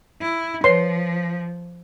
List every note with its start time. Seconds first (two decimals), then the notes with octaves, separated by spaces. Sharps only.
0.21 E4
0.64 F3 B4 C#5 C6